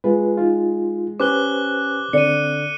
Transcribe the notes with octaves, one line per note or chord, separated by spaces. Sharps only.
G#3 F4 B4
D#4 F4
C#4 G4 B4 C5 D6 F#6 G7
D3 C4 D5 C#7 D#7